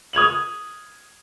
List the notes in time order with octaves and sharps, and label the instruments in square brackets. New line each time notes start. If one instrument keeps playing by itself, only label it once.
[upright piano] D#6 G#6 F7 F#7